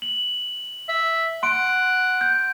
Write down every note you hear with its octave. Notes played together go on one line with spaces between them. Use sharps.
F#7
E5
F#5 C6 D7
G6